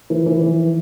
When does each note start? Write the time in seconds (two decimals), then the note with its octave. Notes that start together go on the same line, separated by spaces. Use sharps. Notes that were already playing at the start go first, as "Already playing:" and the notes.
0.10 E3
0.26 E3
0.42 E3